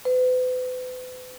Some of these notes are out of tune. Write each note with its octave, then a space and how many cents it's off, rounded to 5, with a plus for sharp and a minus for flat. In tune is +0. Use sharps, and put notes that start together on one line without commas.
B4 +40